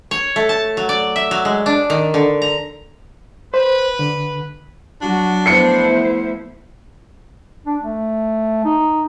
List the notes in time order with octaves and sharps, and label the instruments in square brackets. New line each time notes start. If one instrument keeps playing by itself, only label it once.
[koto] C#5
A3
A5
F#3
D5
E5
F#3
G#3
D4
D#3
D3
A#5
[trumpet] B4 [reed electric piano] C5
[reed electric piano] D3
[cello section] F#3 F#4 [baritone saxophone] D4
[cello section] F3 A3 E4 [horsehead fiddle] B3 C5 [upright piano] C7 C#7
[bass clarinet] D4
A3
D#4